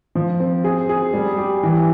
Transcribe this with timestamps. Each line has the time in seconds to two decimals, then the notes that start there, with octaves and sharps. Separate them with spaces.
0.15 F3
0.40 C4
0.64 G#4
0.89 G#4
1.13 G3
1.38 G4
1.63 E3